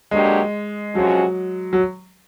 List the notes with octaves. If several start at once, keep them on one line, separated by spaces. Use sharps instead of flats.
D3 F#3 G#3 A#3 D4 G4
C3 F3 F#3 G#3 C#4 F#4
F#3